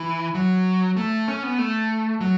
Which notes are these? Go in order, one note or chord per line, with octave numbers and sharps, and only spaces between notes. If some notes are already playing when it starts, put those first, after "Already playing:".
Already playing: E3
F#3
A3
C#4
B3
A3
F#3